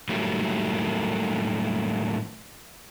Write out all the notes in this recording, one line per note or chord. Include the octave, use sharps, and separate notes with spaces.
A2 D#3 F#3 G3 A3 A#3